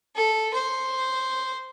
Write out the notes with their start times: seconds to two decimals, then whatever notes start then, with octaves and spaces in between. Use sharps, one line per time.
0.15 A4
0.54 C5